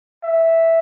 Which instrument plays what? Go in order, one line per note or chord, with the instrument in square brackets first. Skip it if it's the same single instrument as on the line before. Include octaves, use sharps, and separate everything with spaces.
[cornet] E5